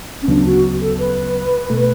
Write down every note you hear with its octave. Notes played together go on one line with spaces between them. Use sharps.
C#4
D2 C#3 F#3 B3 D4
F#4
A4
B4
B2 A3